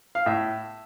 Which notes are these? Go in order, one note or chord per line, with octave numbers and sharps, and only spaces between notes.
F5
A2 E5